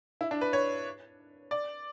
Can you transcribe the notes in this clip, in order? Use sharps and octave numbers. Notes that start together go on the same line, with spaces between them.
E4
D4
B4
C#5
D5